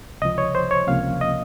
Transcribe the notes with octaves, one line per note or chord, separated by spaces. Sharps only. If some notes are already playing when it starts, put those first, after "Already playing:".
C#2 C3 F3 D#5
C#5
C5
C#5
C#2 C3 F3 A#3 C#4 F5
D#5